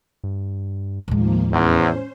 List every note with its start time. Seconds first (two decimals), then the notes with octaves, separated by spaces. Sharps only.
0.24 G2
1.08 D#2 A2 D#3 F3 G#3 A#3
1.52 E2 C#4 C5